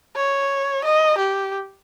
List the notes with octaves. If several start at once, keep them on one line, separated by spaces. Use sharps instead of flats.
C#5
D#5
G4